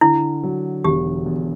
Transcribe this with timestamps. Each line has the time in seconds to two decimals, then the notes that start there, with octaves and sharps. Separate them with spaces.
0.01 D3 E4
0.43 F#3
0.85 E1 G4
1.26 E2